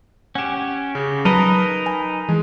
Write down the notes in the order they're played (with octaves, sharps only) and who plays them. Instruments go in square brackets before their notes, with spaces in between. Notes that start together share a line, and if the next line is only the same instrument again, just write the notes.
[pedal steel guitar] C#4 G4 [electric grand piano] F#5 E7
[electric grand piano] C#3
[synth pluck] F#3 [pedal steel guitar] D#4 A#4 D#5 [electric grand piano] B4 A5 B5
[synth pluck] G#5
[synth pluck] E3 [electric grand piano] G#3